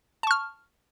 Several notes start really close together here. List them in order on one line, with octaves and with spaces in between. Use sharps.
A5 C#6 F6